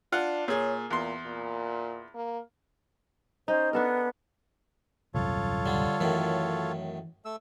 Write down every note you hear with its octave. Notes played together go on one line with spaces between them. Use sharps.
D4 F4 F#5
A#2 G#4 C#5
E2 A#2 C6
A#2
A#3
C#4 D#4 C5
B3 D4 A4 A#4
D#1 C2 F#2 F4 A4 C#5
D3 G3
F#2 A2 D#3 E3
A3 E6